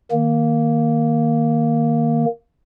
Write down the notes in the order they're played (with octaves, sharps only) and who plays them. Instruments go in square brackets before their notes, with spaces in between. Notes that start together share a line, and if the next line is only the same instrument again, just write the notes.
[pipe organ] D#3 A#3